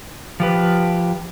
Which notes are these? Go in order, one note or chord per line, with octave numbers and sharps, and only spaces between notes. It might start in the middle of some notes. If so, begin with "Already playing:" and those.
F3 G4 B4